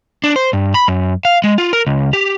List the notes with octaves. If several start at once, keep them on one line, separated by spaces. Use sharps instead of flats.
D4
C5
G2
B5
F#2
F5
G#3
F4
A#4
C#2
G4